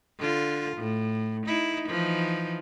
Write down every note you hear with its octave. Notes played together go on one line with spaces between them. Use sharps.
D3 F4
A2
D#4 E4
E3 F3 D#4